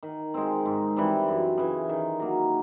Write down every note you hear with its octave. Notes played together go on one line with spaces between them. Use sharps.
D#3
G#3 C4
G#2
E3 G3 C4
F#2
C#3 E3
D#3
F#3 A#3